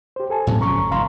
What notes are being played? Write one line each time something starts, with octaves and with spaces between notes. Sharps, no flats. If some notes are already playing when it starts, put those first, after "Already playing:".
G4 C5
A4 G#5 A5
A2 C#3 F#3
G1 F2 C#4 A#5 C#6
F1 F5 A#5 C6